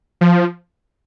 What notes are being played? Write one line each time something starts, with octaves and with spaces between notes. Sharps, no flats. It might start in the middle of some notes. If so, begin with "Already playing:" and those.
F3